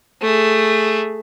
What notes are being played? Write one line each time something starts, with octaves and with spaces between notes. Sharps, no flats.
A3 G#4